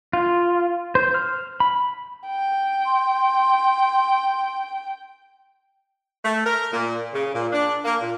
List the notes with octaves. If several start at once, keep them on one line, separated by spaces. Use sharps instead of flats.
F4
C5
F6
B5
G5
C6
A3
A#4
A#2
C#3
A#2
D4
A#3
A#2